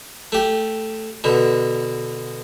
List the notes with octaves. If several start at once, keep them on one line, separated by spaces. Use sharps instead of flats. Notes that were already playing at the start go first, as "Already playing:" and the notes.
A3 G4
B2 D3